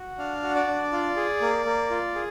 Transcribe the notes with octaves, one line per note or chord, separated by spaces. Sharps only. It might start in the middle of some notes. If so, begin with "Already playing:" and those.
Already playing: F#4
D4 F5
F#4
D5
D4
F4
G#4
A#3
A#3
F4
G#4